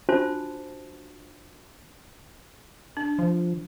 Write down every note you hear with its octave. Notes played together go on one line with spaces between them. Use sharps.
D4 F4 F#4 C5 A5
D4
F3